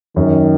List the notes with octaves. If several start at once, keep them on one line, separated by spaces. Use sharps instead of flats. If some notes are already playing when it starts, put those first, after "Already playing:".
F#2 D#3